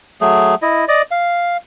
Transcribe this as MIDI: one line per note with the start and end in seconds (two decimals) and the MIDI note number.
0.21 0.55 54
0.21 0.55 57
0.21 0.55 68
0.62 0.85 64
0.62 0.85 75
0.88 1.02 74
0.88 1.02 75
1.11 1.57 77